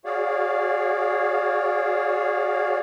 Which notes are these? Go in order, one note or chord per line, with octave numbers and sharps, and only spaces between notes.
F#4 G#4 C#5 D5 F5